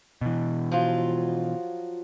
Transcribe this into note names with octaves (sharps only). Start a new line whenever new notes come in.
B2 E3
F3 F#3 F4